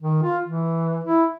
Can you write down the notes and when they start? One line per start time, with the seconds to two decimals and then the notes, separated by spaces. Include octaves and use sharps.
0.01 D#3
0.23 F4
0.45 E3
1.04 E4